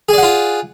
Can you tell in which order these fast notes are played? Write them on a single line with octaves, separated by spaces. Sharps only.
G#4 D5 F#5 F4